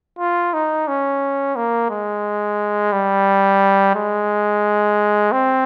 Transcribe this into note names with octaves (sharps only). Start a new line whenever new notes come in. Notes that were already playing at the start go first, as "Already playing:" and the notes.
F4
D#4
C#4
A#3
G#3
G3
G#3
C4